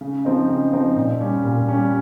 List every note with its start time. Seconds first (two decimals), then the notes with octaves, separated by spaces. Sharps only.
0.01 C#3
0.25 F3 C4 D#4
0.49 C#3
0.73 F3 C4 D#4
0.96 A#2
1.21 G3 C#4
1.44 A#2
1.68 G3 C#4